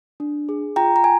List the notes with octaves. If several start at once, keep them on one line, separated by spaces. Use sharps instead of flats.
D4
G#4
F4 G5 A#5
A#5
G#5